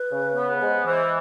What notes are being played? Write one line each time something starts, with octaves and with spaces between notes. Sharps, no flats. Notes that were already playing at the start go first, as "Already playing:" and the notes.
Already playing: B4
C#3
B3
G#3 C5
E3 C5